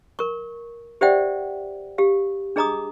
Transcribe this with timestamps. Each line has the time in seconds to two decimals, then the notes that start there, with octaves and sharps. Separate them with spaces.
0.19 A#4 C#6
1.01 G4 C5 D5 E5 F#5 G5
1.98 G4 F5
2.56 D4 G#4 D#5 A#5 D6 D#6